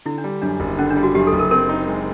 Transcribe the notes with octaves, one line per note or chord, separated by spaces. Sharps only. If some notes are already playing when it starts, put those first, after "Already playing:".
D3 E4
D4
G3
F#2 D4
F#1
D3 C#4
D4
G3
F#4
F#2 G4
A4
F#1
A#4
C4 A#4
D#4
G#3